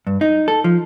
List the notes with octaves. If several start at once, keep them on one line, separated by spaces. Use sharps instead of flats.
G2
D#4
A4
F3